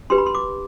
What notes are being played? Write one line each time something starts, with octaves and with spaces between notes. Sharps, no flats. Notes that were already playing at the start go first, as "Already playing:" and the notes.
D4 G4 B4 C6
B5
C6
D6